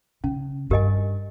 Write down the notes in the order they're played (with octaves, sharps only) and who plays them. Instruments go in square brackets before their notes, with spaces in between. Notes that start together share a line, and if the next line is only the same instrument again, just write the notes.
[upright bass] C#3 [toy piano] C#4
[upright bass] G2 [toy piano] G4 A#4 D#5 G#5